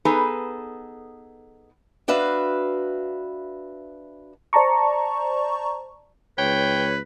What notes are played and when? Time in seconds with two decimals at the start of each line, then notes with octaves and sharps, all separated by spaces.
0.05 B3 D#4 G#4 A4 B4
2.08 D4 F#4 B4 E5 F5
4.53 C5 D5 A5 A#5 C#6
6.38 C#2 B4 C#5 G5